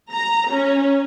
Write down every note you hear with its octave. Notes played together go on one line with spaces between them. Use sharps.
A#5
C#4